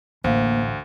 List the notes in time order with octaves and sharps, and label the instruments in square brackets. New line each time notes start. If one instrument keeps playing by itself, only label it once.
[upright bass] A1 [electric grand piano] D2 [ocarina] A#3 [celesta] C5 F5